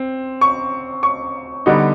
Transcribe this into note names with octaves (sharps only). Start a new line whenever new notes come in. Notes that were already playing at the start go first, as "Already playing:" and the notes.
Already playing: C4
C#6
C#6
D3 G3 B3 D#4